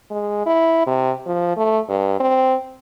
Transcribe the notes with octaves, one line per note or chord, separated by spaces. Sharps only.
G#3
E4
C3
F3
A3
G2
C4